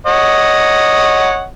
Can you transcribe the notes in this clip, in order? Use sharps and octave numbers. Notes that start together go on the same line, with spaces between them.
C#5 D#5 F#5